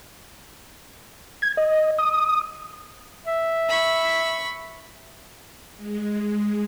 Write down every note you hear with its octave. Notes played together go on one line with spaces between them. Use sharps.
G#6
D#5
D#6
E5
B5 C#6
G#3